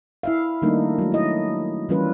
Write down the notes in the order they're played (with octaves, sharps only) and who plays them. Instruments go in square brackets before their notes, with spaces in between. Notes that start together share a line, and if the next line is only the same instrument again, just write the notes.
[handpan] E4 E5 F5
D#3 G3 A3 A#3 D4 D#4
F#3 A3
E4 D#5
E3 G3 C#4 F4 B4